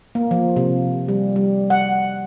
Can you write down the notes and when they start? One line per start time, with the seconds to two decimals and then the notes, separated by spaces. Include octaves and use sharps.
0.15 A#3
0.31 F3
0.56 C3
1.08 G3
1.36 G3
1.70 F#5